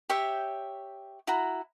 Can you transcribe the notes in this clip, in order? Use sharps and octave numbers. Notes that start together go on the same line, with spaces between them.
G4 C#5 E5 G5
E4 F#4 A#5